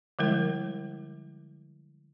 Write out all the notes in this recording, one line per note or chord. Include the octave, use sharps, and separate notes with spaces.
D3 F3 G3 G#3 E4 A#4